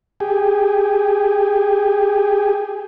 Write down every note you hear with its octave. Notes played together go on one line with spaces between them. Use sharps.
G4 G#4